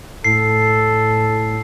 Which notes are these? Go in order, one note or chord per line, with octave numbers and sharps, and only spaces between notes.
A2 A4 C7